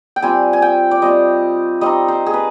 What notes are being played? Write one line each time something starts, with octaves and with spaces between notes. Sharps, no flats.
G5
G3 C4 F4 G#5
G#5
G5
D5
G3 C4 F4 D#5
G3 C4 D#4 D#5
C5
G#4
B4